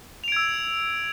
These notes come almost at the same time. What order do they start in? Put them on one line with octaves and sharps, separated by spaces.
F7 D7 G#6 E6